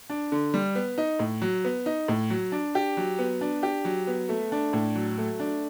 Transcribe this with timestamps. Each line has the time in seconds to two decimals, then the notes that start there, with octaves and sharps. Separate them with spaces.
0.10 D4
0.32 D3
0.54 G3
0.75 B3
0.98 D#4
1.19 A2
1.41 F#3
1.65 B3
1.86 D#4
2.08 A2
2.30 F#3
2.52 D4
2.75 G4
2.97 F#3
3.19 B3
3.41 D4
3.63 G4
3.85 F#3
4.07 B3
4.29 A3
4.52 D4
4.73 A2
4.95 F#3
5.18 A3
5.40 D4